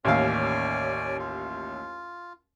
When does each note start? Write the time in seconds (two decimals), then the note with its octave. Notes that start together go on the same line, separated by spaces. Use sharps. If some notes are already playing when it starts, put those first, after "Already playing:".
0.05 A1 D#2 C#4 D5 F5 G#5
1.19 F4